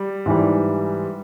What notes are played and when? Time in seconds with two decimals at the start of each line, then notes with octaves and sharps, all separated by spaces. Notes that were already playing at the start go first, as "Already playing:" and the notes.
Already playing: G3
0.26 G#2 E3 G3